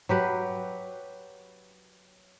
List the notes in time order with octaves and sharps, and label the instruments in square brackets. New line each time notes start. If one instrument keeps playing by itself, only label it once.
[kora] F#3 G4 B4